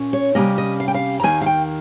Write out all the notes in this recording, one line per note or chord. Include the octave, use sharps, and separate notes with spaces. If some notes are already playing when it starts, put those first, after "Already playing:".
Already playing: A#2 C#4
C#5
C3 G3 A#3 C#4 D#5
D#5
F5
G5
F5
A#5
D#2 D#3 A#3 G#5
F5
G5